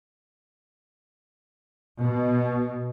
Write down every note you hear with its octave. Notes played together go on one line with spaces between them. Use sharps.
B2